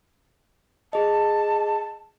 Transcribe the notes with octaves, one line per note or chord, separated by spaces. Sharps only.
G#4 D#5 A5